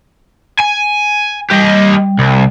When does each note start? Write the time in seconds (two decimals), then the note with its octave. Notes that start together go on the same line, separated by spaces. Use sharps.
0.60 G#5
1.51 G3 G4 D#5
2.19 C2